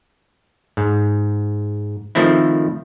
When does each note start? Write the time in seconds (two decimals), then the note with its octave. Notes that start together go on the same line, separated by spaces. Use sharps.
0.77 G#2
2.15 D#3 F3 A3 C4 E4